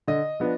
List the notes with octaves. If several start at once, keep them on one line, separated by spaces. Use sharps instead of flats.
D3 D#5
F3 B3 D4